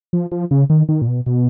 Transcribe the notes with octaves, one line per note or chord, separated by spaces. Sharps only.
F3
F3
C#3
D#3
D#3
A#2
B2
B2